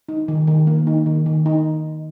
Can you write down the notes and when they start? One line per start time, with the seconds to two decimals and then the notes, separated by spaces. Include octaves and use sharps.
0.09 D#4
0.28 D#3
0.47 D#3
0.67 A#3
0.87 D#4
1.06 D#3
1.26 D#3
1.46 D#4